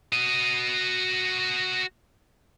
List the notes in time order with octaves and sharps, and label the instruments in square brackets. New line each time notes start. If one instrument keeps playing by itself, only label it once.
[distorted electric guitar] F#4 D#5